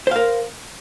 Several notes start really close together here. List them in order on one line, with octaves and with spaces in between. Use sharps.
C5 F5 A#4